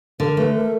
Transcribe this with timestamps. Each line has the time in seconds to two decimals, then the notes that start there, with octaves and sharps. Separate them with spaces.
0.20 D3 A#4
0.37 A3 B4
0.55 A#4